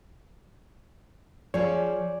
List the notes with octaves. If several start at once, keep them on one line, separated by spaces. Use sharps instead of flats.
F3 G#4 C#5 D5 G#5